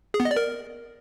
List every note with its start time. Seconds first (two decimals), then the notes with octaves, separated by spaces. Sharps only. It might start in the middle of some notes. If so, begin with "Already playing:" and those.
0.14 G#4
0.20 B3
0.25 D#5
0.31 D5
0.37 A#4